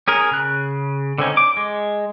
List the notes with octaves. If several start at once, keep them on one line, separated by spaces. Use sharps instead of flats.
C#4 G#4 A#4
C#3 F#6
D3 C4 C#4 D#4
D6
G#3